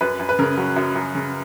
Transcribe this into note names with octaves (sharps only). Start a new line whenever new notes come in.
F#2 B4
F#2
B4
C#3 A#4
F#3
F#2
F#2
C#3